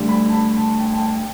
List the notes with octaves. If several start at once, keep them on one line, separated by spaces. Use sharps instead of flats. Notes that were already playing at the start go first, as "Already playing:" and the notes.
Already playing: D2 D3 G3
B5
A5
B5
A5
G5
A5
G5